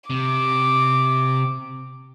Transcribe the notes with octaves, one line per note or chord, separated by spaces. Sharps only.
C3 D6